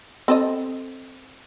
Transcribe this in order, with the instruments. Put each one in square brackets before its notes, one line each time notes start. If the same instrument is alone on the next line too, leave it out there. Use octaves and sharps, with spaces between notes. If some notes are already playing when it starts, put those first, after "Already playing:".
[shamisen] C4 A4 D#5